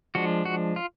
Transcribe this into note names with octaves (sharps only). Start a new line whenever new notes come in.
F3 G#3 D4 F#4
F#4
F4